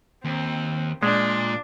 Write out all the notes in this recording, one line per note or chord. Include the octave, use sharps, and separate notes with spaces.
D#2 C4
A#2 G#3 D4